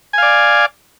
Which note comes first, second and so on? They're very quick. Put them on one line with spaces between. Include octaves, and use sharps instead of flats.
G#5 F5 D5